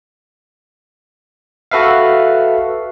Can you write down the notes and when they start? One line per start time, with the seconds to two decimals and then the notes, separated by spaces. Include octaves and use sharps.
1.71 F#4 A4 B4 E5 F5